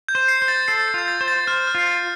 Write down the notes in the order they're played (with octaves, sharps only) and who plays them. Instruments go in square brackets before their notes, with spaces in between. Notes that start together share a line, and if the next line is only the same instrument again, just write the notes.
[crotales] G6
[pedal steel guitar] C5
[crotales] C7
[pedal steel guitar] C5
[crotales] A6
[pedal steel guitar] A4 [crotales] C7
[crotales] C7
[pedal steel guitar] F4 [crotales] G6
[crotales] A6
[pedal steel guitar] C5
[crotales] A6
[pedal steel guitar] C5 [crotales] F6
[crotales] F6
[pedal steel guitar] F4 [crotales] C7
[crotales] A6